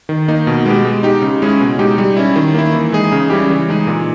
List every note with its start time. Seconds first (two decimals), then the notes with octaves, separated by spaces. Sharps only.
0.09 D#3
0.28 A#3 D#4
0.47 B2
0.66 G#3 B3 G4
0.85 G#3
1.03 D#4 G4
1.22 C#3
1.42 G#3 C#4 E4 G#4
1.60 B2
1.79 G#3 D#4 G4
1.98 G3
2.16 C#4 E4
2.36 D#3
2.54 A#3 E4
2.73 E3
2.92 G#3 D#4 G#4
3.12 C#3
3.30 G3 C#4 E4 G4
3.50 E3
3.69 G#3 D#4 G#4
3.87 A#2